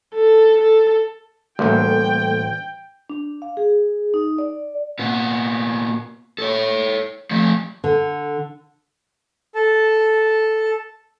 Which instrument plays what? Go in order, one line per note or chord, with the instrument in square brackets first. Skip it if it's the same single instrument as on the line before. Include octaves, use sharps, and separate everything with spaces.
[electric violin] A4
A4
[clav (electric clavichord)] A1 D2 [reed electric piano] G3 A#3 A4 [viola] G5
[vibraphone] D4
F5
G#4
D#4
D5
[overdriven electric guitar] A#2 B3
A4 C#5
F3 A3
[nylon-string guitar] D3
[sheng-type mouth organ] A4 A5